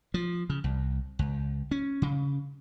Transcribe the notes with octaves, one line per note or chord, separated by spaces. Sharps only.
F3
C#3
C2
C#2
C#4
C#3